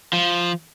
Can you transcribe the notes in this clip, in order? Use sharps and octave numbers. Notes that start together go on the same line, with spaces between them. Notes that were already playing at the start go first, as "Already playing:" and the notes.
F3